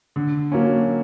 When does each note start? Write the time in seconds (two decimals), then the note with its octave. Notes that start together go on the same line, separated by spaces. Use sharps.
0.16 D3
0.52 F#3 A#3 C#4